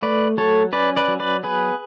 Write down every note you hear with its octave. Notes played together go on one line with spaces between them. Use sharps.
A3 B4 D5
F#3 A4 C#5
C#4 B4 D5
B4 D5
F#3
B4 D5
B3 G#4 B4